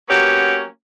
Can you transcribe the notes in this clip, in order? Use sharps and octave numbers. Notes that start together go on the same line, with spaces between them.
F#3 A#3 B3 C#4 F#4 G4